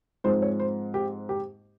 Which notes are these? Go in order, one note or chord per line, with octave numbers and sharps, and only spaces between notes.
G#2 F3 G#3 C4 D#4 C5
C#5
C5
G4
G4